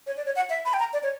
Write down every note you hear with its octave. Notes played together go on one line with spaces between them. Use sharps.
C#5
D5
C#5
F#5
E5
B5
G5
A#5
D5
C#5